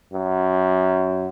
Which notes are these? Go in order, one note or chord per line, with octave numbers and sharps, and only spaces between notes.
F#2